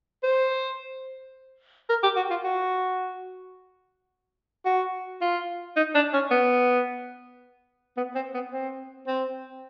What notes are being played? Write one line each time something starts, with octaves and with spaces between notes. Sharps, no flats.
C5
A#4
G4
F#4
F4
F#4
F#4
F4
D#4
D4
C#4
B3
B3
C4
B3
C4
C4